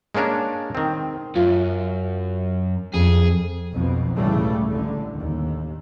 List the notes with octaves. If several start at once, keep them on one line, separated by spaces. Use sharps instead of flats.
G#3 A#3 C#4 D4 A#4
D#3 C4
F#2 F4 E5
F2 G#4
B1 F2 B2
C#2 A2 C#3 E3 G3 A3
A1 D3
D#2